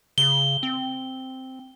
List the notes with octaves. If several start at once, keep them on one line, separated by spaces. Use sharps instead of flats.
C#3 G7
C4